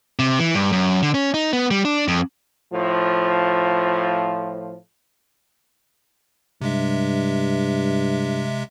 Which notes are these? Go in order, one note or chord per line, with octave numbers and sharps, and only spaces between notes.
C3
E3
G2
F#2
D3
C#4
D#4
B3
G3
D4
F2
A2 F3
G2 C3 G#3 E5